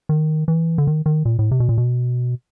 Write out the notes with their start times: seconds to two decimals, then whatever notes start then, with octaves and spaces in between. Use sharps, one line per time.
0.09 D#3
0.48 E3
0.78 D3
0.87 D#3
1.06 D#3
1.25 A#2
1.39 A2
1.51 C3
1.60 B2
1.69 A#2
1.78 B2